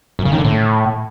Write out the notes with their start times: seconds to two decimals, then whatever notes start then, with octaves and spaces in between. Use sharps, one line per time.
0.19 F#2
0.25 C#3
0.32 D#3
0.38 D3
0.45 A2